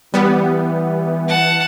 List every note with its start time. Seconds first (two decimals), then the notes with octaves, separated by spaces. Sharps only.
0.14 E3 G3 B3
1.28 F#5 A5